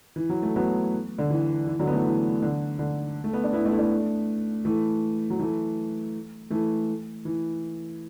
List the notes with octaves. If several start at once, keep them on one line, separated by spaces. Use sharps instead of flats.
E3
F#3
A3
F#3 B3
D3
E3
E3
D3 F#3
B3
E3 A3
E3
D3
D3
A3
B3
D4
B3 E4
A3 D4
E4
A3 D4
E3 A3
F#3
E3 A3
E3 A3
E3